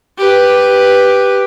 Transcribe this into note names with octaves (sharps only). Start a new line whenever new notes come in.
G4 B4